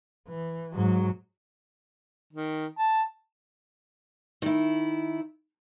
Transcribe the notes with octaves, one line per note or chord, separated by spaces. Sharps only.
E3
G#2 F#3
D#3
A5
D#3 E4